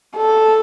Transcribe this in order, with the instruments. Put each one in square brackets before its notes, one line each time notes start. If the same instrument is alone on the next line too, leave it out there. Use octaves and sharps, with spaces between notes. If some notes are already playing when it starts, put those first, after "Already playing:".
[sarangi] A4